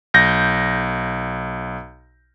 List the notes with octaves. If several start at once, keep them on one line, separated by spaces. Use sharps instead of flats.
B1 G6 A#6